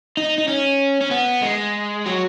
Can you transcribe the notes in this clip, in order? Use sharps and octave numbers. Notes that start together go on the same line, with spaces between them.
D#4
D#4
C#4
C#4
B3
G#3
F#3